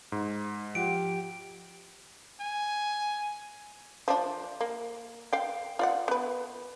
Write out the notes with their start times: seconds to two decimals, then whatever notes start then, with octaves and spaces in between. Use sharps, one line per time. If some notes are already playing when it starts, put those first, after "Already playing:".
0.12 G#2
0.75 F3 F4 G4 F#5 D7
2.41 G#5
4.08 F3 D4
4.61 A#3
5.33 F5 G5
5.79 F4 D5 F#5
6.08 B3 B4